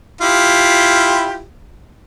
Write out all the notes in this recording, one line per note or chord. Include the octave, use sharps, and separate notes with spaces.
E4 F4 G4